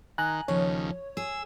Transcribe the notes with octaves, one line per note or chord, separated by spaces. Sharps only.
D#3 G#5 A#5 F#6
D#2 C#3 F3 C#5
G#4 E6